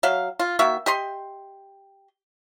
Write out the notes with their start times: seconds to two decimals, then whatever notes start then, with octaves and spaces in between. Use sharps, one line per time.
0.03 F#3 E5 F5
0.39 F4
0.59 D#3 A#3 F#4 E5
0.86 G4 D#5 C6